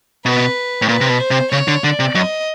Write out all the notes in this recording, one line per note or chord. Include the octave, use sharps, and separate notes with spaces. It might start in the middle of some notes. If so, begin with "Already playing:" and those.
B2 B4
A2
A#2 B4
C3
B2
C5
C3
C#3 C#5
D3
D3 D5
C3
F#2 D#5